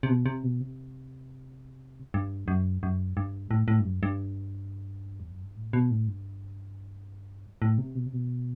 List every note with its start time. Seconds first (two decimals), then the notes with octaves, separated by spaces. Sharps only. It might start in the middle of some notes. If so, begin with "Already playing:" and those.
0.03 C3
0.09 B2
0.26 C3
0.43 B2
0.61 C3
2.14 G2
2.48 F#2
2.83 F#2
3.17 G2
3.51 A2
3.68 A2
3.80 G2
3.85 F#2
4.03 G2
5.20 E2
5.31 F#2
5.44 G2
5.56 A2
5.73 B2
5.91 A2
6.08 G2
7.62 A2
7.78 C3
7.95 B2
8.06 C3
8.13 B2